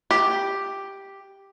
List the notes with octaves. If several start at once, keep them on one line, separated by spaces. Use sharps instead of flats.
G4